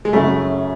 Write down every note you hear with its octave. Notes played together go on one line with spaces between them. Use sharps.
G#3
F#2 C#3 F#3 A3 C#4 E4